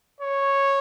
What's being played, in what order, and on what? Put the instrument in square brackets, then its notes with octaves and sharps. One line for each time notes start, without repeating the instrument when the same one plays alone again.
[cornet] C#5